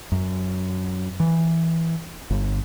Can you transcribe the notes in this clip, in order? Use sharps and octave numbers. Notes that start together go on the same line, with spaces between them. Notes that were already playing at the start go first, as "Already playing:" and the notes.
F#2
E3
G1